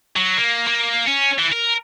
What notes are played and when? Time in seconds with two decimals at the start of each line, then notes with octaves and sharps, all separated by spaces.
0.16 F#3
0.37 A#3
0.67 A#3
1.07 C#4
1.39 E3
1.52 A#4